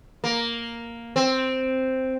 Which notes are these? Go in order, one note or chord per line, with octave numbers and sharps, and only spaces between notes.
A#3
C4